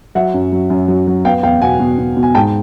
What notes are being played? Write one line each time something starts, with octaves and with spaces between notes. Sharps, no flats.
F#3 E5 F#5
F#2
F#3
F#2
F#3
F#3
B3 F5 G5
E2 F5 G5
B2 F#5 G#5
B2
B2
B2
G#5
G#2 G5 A5